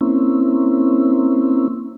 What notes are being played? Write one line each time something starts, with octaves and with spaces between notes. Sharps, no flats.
A#3 C4 C#4 E4